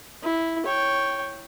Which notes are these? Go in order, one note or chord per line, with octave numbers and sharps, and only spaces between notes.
E4
C#5 G5